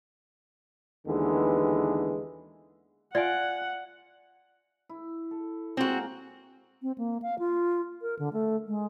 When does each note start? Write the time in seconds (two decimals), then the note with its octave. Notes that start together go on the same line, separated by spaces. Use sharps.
1.07 D#2 D3 E3 G#3 B3
3.15 F4 D5 E5 F#5 G#5
4.89 E4
5.31 A4
5.77 G#3 A#3 C4 F4 F#4
6.82 C4
6.98 A#3
7.22 F5
7.39 F4
8.02 A#4
8.19 D3
8.33 A3
8.66 G#3